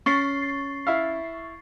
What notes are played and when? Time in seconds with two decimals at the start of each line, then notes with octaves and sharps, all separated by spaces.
0.06 C#4 C#6 A6 C7
0.87 E4 E5 F5